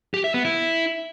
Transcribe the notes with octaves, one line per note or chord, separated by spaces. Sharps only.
G4
E5
B3
E4